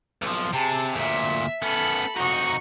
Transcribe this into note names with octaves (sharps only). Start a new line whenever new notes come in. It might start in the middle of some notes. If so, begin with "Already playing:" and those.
B1 F3
C3 G#4 A5
D2 A#2 E5
B3 C#4 A4 B5
F2 D#4 F#4 C#6